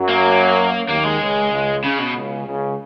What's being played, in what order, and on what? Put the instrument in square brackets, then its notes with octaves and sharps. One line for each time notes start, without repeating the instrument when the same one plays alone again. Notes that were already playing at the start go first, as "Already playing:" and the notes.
Already playing: [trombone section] F#2 F#3
[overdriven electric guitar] A#3
[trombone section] D#2 D#3 [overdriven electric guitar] A#3
[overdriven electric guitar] G#3
[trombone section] C#2 C#3
C#2 C#3
[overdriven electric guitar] C#3
B2
[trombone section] C#2 C#3
C#2 C#3